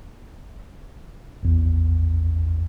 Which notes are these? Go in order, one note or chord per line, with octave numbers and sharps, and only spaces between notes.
A1 E2